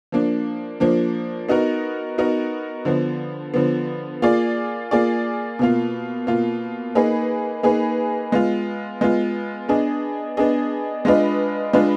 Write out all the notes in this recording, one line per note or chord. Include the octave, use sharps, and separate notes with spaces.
F3 A#3 D4
F3 A#3 D4
B3 D#4 F#4 A#4
B3 D#4 F#4 A#4
D3 F3 B3
D3 F3 B3
A#3 F4 G#4 D5
A#3 F4 G#4 D5
B2 A#3 F4
B2 A#3 F4
A#3 D#4 G#4 B4
A#3 D#4 G#4 B4
G#3 B3 F4
G#3 B3 F4
B3 D4 G#4 D#5
B3 D4 G#4 D#5
G#3 D4 F4 B4 D#5
G#3 D4 F4 B4 D#5